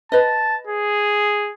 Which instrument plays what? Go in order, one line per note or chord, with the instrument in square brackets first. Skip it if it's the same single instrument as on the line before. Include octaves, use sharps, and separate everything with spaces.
[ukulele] B4 D#5 [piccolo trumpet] A5
[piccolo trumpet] G#4